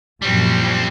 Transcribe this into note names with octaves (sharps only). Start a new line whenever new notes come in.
F#2 A#2 F3 G3 C4